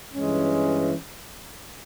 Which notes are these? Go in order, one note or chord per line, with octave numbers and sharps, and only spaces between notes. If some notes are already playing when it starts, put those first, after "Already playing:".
G2 E3 G#3 C#4